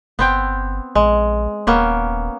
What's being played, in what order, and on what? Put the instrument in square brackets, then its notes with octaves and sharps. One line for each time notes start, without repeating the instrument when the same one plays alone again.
[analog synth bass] G1 [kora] B3 C4 G5
[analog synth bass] A#1 [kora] G#3
[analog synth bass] D#1 [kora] A#3 B3 C#4